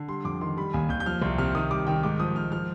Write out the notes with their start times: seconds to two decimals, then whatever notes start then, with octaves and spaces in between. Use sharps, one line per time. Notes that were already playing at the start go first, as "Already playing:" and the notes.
Already playing: D3
0.08 G3 C6
0.25 F2 D6
0.41 D#3 C6
0.57 G3 B5
0.73 D#2 G#5
0.89 D#2 G6
1.00 G6
1.06 F3 F6
1.22 C2
1.38 C3 F6
1.55 D#3 D#6
1.71 G3 D6
1.87 D#3 G5
2.03 G#2 D6
2.20 F3 D#6
2.36 G#2 F6
2.52 F3 F6